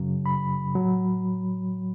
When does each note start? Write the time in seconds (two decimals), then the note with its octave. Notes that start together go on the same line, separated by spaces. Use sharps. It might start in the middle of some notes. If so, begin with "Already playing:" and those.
Already playing: F#2 C#3 F#3
0.26 B5
0.74 A2 F#3